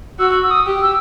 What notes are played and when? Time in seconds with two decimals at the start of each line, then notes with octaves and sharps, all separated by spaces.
0.19 F#4 E6
0.43 E6
0.51 D#6
0.67 G4
0.82 E6